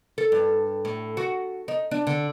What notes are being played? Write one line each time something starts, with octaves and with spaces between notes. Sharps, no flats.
A4
G2
A2
F#4
D#4
D4
D3